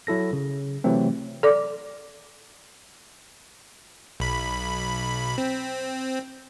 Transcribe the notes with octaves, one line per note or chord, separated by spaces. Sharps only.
F#3 E4 A4 A#6
C#3
C3 E3 F#3 A3 C4
A4 D5 D6
B1 B5
C4